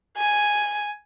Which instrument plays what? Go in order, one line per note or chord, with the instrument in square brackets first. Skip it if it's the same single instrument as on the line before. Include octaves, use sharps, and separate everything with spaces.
[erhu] G#5